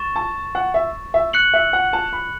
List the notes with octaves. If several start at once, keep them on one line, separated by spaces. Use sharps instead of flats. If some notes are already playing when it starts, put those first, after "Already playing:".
Already playing: C#6 A6 E7
A5
F#5
E5
E5
F#6 C#7 F#7
E5
F#5
A5
B5